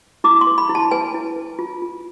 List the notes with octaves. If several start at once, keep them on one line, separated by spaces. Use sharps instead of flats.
E4 D6
C6
B4
B5
E4
A5
B4 G#5
E4
B4
F4
F4